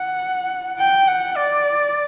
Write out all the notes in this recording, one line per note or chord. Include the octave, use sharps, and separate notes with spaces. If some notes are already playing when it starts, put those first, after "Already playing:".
Already playing: F#5
G5
F#5
D5